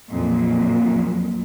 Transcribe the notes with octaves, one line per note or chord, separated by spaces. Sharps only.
A#1 F2 A#2 F#3